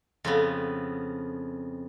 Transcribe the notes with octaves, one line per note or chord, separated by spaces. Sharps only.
F2 C#3 B3